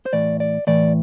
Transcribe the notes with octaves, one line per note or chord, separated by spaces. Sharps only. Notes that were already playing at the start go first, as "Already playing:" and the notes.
C5
A2 E3 D5
D5
A2 E3 D5